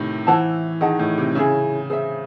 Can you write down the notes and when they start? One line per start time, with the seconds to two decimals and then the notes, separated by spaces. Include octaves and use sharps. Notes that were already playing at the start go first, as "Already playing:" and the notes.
Already playing: A2 C3 D#3
0.27 E3 E4 C5 F#5 A5
0.81 D#3 G#4 D#5 F#5 A5
0.99 A2
1.18 C3
1.35 C#3 C#4 E4 G#4
1.90 G#4 C5 E5